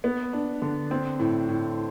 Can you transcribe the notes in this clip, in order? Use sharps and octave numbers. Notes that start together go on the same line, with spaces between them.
B3
D4
D3
C4
A2
A2